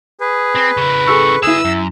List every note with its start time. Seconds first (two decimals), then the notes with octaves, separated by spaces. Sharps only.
0.21 G#4 B4
0.55 C4
0.77 C#3 E4
1.07 G#4 A4 C#6 E6
1.43 D3 E4 G#4 B4 E6 E7
1.65 F#2 E5